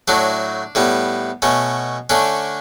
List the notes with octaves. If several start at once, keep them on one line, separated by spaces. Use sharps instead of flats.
A2 F#3 A3 D4
A2 G3 B3
B2 A3 C#4
D3 A3 C#4 D4